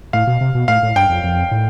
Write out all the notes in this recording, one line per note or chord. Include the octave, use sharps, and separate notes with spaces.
A2 F5
B2
C3
B2
A2 F5
A2
G2 G5
F2
F2
A2